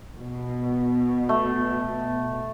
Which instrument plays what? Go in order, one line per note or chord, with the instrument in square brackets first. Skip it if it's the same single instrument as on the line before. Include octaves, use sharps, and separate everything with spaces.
[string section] B2
[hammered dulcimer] A3